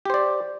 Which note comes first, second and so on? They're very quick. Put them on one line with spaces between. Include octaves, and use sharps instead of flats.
G4 C5 D5